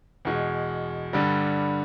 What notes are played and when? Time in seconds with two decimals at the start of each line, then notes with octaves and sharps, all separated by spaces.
0.25 E2 B2 G#3
1.13 G2 D3 G3